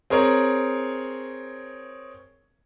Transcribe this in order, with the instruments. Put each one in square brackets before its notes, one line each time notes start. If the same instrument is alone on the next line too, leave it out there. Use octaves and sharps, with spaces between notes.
[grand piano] C4 G#4 A#4 C#5